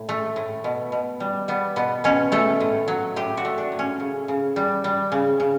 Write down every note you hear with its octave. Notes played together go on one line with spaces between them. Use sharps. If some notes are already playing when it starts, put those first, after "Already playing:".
Already playing: A2
A3
A2
B2
B2
G3
G3 B3
B2 B3
B2 C#4
A3 A4
A2
F#3
A2 G4
F#4
A3
D4
A2
C#4
C#3
C#3
G3
G3
C#3
C#3